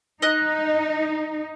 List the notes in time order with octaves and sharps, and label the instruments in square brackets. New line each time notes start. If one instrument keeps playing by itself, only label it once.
[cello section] D#4 [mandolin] D#5 F#6